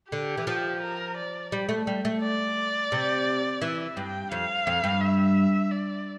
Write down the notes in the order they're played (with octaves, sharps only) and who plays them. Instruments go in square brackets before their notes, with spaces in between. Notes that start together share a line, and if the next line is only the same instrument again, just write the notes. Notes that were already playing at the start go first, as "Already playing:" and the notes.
[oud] D3 [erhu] G4
[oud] E3
F3
[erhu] A#4
D5
[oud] G3
A3
G3
A3
[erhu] D5
[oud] C3
[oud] E3 [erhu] E5
[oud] G2 [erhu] G5
[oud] F2 [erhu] F5
[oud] F2
G2
[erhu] E5
D5